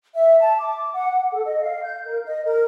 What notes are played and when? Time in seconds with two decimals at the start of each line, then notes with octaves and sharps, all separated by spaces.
0.14 E5
0.39 A5
0.58 D6
0.94 F#5
1.10 F#5
1.32 A4
1.45 D#5
1.61 F5
1.83 G6
2.05 A#4
2.25 D#5
2.44 A#4